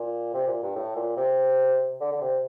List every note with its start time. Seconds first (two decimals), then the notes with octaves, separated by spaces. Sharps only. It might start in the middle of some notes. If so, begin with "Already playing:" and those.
Already playing: A#2
0.34 C3
0.48 A#2
0.62 G2
0.75 A2
0.96 A#2
1.17 C3
2.01 D3
2.12 D3
2.21 C3